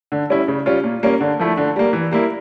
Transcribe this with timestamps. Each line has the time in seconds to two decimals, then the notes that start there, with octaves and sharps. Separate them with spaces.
0.12 D3
0.30 G3 C#4 E4
0.48 C#3
0.66 G3 C#4 F4
0.84 A#2
1.03 G3 A#3 C#4
1.21 D3
1.39 F3 A3 E4
1.57 D3
1.76 G3 A#3
1.93 E3
2.11 G3 A#3 E4